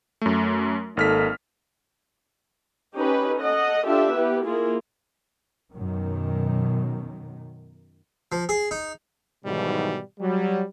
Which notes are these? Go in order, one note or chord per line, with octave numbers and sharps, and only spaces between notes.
F#2 A3
G#1 A#3 D#4 A4 F6 B6
C#4 D#4 G4 B4
A4 D#5 F#5
D4 F4 G4 A4 E5
B3 E4 G4 B4
A#3 E4 F4 G#4
F#2 B2 D#3
F3
G#4
D#4
G#2 B2 D#3 E3 F#3 G3
F#3 G3